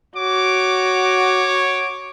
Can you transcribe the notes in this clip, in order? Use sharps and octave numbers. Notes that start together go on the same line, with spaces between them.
F#4 C#5 D6